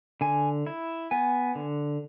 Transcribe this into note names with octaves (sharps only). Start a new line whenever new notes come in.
D3 G#5
E4
B3 G#5
D3